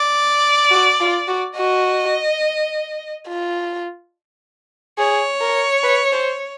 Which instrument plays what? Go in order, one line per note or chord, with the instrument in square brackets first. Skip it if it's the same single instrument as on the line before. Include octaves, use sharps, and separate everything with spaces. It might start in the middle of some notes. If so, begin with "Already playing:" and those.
Already playing: [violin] D5
[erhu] F#4
F4
F#4
[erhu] F#4 [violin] D#5
[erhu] F4
[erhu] G#4 [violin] C#5
[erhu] A#4
B4
C5